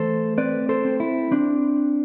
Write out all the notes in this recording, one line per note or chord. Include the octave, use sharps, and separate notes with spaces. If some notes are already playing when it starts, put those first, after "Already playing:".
Already playing: E3 A3 A4 C5
C4 B4 D5
A4 C5
C4
E4
C4 D4